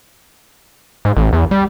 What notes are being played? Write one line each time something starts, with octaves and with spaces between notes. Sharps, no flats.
G#2
A1
E2
G3